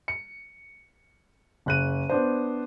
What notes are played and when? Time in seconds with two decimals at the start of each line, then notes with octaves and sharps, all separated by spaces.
0.08 C#7
1.66 F#1 F#6 D#7
2.10 B3 D4 C5